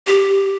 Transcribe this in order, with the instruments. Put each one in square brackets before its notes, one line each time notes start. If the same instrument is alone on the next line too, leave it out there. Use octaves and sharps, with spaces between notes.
[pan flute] G4